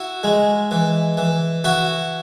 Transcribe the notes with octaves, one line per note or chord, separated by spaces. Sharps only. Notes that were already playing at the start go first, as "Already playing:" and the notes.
Already playing: E4 F#4
G#3
E3
E3
E4 F#4